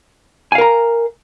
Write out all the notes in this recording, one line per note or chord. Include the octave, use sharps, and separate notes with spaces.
A#4 F5 G#5 A#5